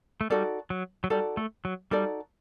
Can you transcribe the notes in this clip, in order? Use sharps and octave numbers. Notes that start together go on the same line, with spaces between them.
A3
G3 D#4 F#4 A4 D5
F#3
F#3
G3 D#4 F#4 A4 D5
A3
F#3
G3 D#4 F#4 A4 D5